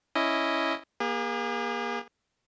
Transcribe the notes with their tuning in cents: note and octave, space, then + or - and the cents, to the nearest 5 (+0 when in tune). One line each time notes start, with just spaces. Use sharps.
C#4 +0 E4 +0 D#5 +0
A#3 +30 G#4 -35